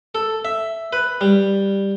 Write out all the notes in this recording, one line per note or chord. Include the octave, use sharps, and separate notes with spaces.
A4
E5
B4
G3